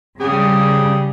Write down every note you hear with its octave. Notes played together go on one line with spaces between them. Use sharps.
C#3 G3 G4 G#4